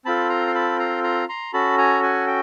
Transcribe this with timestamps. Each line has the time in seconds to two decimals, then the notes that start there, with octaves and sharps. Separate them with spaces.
0.05 C4 F4 A4 A5 B5
0.29 A#5 C6
0.47 C6
0.54 A5 B5
0.79 A#5 C6
1.04 A#5 C6
1.29 A#5 C6
1.53 C#4 F#4 A4 A5 B5
1.78 G#5 A#5
2.03 F#5 G#5
2.27 G5